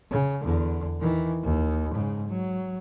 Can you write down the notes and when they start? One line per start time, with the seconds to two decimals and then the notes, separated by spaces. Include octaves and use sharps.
0.11 C#3
0.42 E2 D3
1.01 D#3 E3
1.43 D#2
1.95 G#2 C#3
2.28 F#3